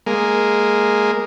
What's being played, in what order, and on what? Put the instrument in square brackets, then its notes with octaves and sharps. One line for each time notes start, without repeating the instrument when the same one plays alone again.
[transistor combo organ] G#3 A#3